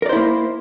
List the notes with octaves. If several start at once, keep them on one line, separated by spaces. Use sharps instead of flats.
A#3 E4 A#4 C5 D5